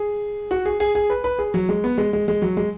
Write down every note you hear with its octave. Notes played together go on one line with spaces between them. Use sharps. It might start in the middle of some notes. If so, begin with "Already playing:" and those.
Already playing: G#4
F#4
G#4
G#4
G#4
B4
B4
G#4
F#3
G#3
B3
G#3
G#3
G#3
F#3
G#3